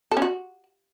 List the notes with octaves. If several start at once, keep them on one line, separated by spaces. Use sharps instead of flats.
A4
C#4
F#4